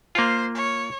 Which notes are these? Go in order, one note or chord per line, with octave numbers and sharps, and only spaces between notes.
A#3 F4 C5
C#5